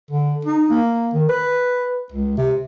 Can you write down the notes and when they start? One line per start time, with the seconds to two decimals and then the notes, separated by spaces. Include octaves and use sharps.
0.11 D3
0.45 D#4
0.70 A#3
1.14 D#3
1.29 B4
2.12 C#2
2.37 C3